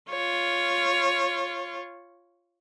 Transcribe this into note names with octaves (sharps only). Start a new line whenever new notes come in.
F4 C#5